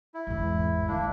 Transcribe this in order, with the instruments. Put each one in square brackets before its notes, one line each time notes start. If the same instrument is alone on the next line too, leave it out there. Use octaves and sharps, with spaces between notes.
[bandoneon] E4
[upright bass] G#1 E2
[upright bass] D#3 G3 [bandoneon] A#3 D4 E4